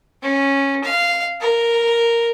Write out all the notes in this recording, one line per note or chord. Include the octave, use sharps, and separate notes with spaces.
C#4
F5
A#4